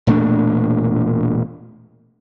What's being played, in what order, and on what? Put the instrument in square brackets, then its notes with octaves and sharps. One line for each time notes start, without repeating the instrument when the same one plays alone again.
[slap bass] E1 A#2 A3 D4